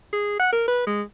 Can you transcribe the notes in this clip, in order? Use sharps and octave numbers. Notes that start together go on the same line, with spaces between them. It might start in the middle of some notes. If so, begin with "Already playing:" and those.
G#4
F#5
A#4
B4
G#3